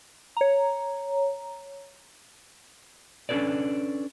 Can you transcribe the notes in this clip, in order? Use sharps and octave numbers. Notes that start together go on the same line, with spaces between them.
C#5 A#5
C#4 D4 A4 B4 D5